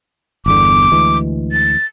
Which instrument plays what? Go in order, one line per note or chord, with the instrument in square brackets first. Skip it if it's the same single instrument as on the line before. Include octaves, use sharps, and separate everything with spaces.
[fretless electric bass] G1 E2 D3 [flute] D6
[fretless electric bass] D2 E3 G#3
[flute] A6